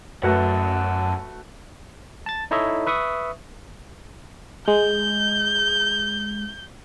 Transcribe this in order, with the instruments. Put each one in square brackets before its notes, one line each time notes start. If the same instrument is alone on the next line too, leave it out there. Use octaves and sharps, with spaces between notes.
[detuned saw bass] F#2 [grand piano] A3 F#4 B4 [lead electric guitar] F#5 A5
[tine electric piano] A5 A6
D#4 E4 A4 C#5 D#5 E5
B4 E5 C#6 D#6
[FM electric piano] G#3 [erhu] G6